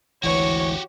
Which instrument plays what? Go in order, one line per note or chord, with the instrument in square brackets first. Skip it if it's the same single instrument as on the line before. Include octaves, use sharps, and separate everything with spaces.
[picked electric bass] G#1 D2 [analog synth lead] E3 [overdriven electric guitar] F#4 G4 [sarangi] C#5